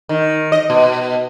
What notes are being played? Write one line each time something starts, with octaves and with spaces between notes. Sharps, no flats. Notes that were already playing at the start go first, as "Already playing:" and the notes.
D#3
D#5
B2